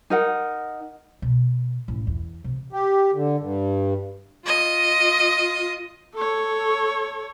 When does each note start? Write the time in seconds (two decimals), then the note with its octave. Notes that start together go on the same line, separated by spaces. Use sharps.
0.10 D#4 A#4 F#5
1.22 B2
1.88 A1
2.07 E2
2.44 C3
2.73 G4
3.14 D3
3.40 G2
4.45 F4 D#5
6.14 A4 C#5